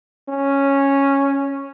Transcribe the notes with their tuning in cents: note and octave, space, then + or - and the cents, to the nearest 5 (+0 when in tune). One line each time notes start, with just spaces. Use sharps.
C#4 -5